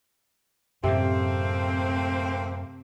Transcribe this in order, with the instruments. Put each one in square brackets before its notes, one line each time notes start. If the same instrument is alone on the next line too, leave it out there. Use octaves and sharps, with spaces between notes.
[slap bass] F#2 A2 [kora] C3 [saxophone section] A3 A#3 C4